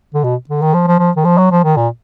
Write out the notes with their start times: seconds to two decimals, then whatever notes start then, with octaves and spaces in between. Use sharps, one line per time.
0.14 D3
0.24 B2
0.49 D3
0.62 D#3
0.74 F3
0.87 F3
0.99 F3
1.16 D#3
1.25 F3
1.38 F#3
1.51 F3
1.64 D#3
1.76 A#2